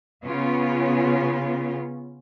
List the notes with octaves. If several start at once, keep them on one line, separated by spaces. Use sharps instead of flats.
C#3 B3 C#4 F4